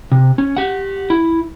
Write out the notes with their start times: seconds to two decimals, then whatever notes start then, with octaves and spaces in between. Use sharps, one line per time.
0.12 C3
0.38 C#4
0.57 G4 F#5
1.10 E4